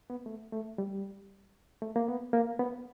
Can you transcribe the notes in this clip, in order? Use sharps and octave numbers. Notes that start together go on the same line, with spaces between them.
B3
A3
A3
G3
A3
A#3
B3
A#3
B3